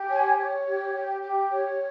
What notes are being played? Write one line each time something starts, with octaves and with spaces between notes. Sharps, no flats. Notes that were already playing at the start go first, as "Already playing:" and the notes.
Already playing: G4
C#5 G#5
C#5
G4
G4
G4
C#5